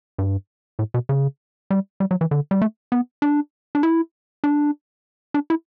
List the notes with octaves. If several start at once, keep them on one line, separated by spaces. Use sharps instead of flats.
G2
A2
B2
C#3
G3
G3
F#3
E3
D3
G3
A3
B3
D4
D4
E4
D4
D4
E4